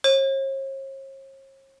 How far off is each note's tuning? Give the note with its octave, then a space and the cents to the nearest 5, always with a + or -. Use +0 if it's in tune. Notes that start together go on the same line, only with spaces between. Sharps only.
C#5 -45